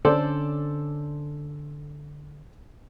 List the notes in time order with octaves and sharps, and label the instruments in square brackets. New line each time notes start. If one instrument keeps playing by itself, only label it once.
[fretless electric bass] D3 C4 C#4 [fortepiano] A4 C5 D5